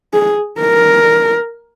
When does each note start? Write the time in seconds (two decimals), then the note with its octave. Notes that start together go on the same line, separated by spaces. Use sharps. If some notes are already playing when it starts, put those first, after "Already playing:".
0.13 G#4
0.60 A#4